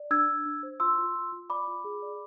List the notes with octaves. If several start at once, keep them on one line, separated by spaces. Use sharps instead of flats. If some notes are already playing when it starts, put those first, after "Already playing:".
Already playing: D5
D4 E6 G#6
D4
D4
C5
F4 C6 E6
F4
F4
F4
D5 B5 D6
F4
G#4
D5